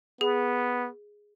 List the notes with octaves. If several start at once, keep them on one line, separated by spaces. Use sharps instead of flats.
B3 G#4